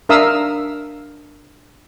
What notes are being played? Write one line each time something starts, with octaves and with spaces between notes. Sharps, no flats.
D4 A#4 E5 F5 D#6 E6